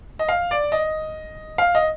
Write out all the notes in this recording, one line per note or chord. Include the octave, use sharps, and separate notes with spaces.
D#5
F5
D5
D#5
F5
D#5